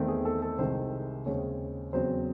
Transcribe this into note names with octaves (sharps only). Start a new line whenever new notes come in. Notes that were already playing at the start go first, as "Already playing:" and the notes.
Already playing: E2 D#3 A3 C4
G#4
A4
A4
C2 C3 D#3 G#3 C5
D#2 C#3 G#3 C4 C#5
E2 C#3 F#3 C4 C5